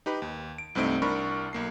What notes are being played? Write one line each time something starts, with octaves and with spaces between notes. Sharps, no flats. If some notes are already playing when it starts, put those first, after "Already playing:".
D#4 G4 B4 B5
D#2
D7
C2 G2 A3 C4 D#4 D7
C2 D4 A#4 B5 C#6
B1 A#3 C7